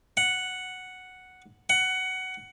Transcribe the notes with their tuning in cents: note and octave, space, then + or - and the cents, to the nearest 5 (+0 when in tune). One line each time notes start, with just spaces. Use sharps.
F#5 +0
F#5 +15